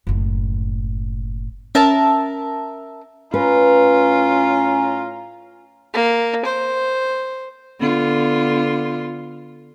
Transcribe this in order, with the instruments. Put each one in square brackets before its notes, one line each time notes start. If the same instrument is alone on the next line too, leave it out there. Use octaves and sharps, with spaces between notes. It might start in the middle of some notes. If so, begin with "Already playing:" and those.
[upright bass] F#1 A2
[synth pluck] C#4 [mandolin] A#4 E5 A5
[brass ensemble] A2 C#5 A#5 [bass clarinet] C#4 [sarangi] F4 [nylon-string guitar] B4
[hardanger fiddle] A#3
C5
[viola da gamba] D3 B3 F4